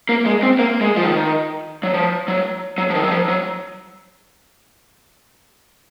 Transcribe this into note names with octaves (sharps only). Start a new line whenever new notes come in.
A#3
G#3
C4
A#3
G#3
F3
D#3
F#3
F3
F#3
F#3
F3
D#3
F#3
F3
F#3